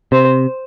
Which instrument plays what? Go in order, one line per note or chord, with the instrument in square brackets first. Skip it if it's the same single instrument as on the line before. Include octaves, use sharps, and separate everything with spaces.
[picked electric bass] C3 [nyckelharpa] C5